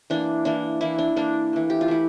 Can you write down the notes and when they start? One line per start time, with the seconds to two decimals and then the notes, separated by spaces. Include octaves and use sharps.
0.10 E3 A#3 D4
0.45 E3 A#3 D4
0.81 E3 A#3 E4
0.98 D4
1.16 E3 A#3 D4
1.53 E3 A3
1.70 G4
1.81 F4
1.88 E3 A3 E4